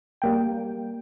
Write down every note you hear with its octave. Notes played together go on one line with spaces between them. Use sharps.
G3 A#3 G5